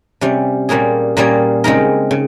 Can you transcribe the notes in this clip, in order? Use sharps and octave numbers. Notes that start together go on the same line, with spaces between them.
C3 G3 C#4
A#2 G3 A#3 C#4 G#4
A#2 G3 A#3 C#4 G#4
C#3 G#3 C4 D#4 A#4
C#3